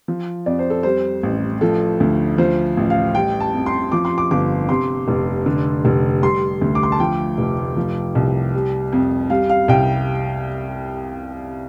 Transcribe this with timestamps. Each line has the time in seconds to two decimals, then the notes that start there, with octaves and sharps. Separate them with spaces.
0.08 F3
0.46 F2 D5
0.59 C5
0.70 A4
0.83 G3 C5
1.23 A1
1.61 F3 A4
2.00 D2
2.38 F3 C5
2.77 A1
2.90 F5
3.15 G3 G5
3.40 A5
3.54 F2
3.66 C6
3.92 F3 D6
4.05 C6
4.18 D6
4.31 G1 D6
4.68 C3 C6
5.08 F1
5.46 D3
5.85 F1
6.22 G3 C6
6.61 D2
6.75 D6
6.83 C6
6.92 A5
7.00 F3 G5
7.38 F1
7.77 F3
8.15 C2
8.54 G3
8.93 F2
9.30 G3 F5
9.50 F5
9.68 C2 G5